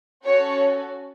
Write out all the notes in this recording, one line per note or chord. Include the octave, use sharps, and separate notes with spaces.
C#4 F#4 A4 C#5